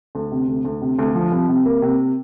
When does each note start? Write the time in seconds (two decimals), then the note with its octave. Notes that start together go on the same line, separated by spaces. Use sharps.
0.15 D2
0.32 C3
0.48 D2
0.65 D2
0.82 C3
0.99 D2
1.15 F3
1.32 C2
1.48 C3
1.66 A#3
1.82 C3